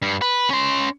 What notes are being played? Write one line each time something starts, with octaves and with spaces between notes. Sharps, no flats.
G2
B4
C#4 C6